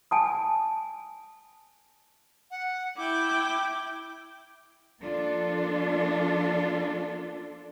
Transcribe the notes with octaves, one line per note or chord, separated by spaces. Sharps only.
G#5 A5 D#6
F#5
E4 G5 D6
F3 A#3 D4 F4 A4